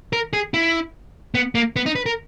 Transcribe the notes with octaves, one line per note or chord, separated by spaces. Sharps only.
A#4
G#4
E4
B3
A#3
B3
D#4
B4
A#4